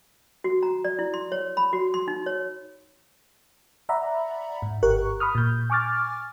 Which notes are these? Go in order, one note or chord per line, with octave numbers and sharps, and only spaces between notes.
F#4
A#5
D5
E4
C6
C#5
B5
F#4
C6
D#4
C#5
D5 E5 F#5 A#5 B5
G#2
G1 G4 A#4 C#6 F#6
B5 C#6 D#6 F6
A#2 G6
G#5 C#6 D6 F6 A6